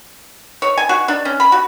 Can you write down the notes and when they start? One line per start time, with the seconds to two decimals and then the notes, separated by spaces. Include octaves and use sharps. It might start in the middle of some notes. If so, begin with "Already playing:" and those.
0.62 C#5
0.78 G#5
0.89 F#4
1.08 D4
1.25 C#4
1.40 B5
1.52 F#4